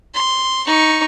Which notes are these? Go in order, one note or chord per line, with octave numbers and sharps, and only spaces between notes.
C6
D#4 C#6